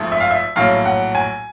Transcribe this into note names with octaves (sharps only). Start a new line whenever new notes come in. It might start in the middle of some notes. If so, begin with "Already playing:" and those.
Already playing: G#1 G#2 F3 A3
E5
F5
E5
A#1 A2 F#3 F5
F#5
G#5